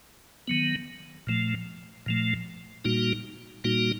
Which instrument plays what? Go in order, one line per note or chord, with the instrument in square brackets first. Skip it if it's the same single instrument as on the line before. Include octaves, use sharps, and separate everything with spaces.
[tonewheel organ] D#3 F#3 B3
A#2 F3 A3
A#2 F3 A3
A#2 G3 A#3 D#4 F#4
A#2 G3 A#3 D#4 F#4